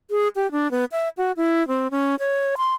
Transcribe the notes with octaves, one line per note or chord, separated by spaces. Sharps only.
G#4
G4
D4
B3
E5
F#4
E4
C4
C#4
C#5
C6